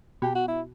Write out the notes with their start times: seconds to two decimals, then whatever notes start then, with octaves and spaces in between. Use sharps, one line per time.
0.22 B2 G4
0.35 F#4
0.48 E4